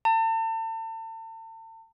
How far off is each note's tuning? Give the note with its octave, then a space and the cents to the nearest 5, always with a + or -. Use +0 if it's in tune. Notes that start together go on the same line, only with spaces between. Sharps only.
A5 +40